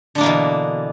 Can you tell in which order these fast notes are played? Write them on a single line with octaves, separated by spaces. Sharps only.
D3 D4 A#3 E3 B2